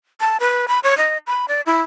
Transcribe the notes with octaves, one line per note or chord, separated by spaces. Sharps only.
A5
B4
B5
C#5
D#5
B5
D5
E4